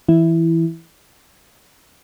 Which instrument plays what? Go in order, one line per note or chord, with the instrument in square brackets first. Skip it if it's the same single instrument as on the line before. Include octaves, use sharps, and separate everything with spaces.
[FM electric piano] E3 E4